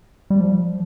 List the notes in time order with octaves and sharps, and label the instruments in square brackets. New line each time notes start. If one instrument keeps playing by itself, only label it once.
[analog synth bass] G3
F3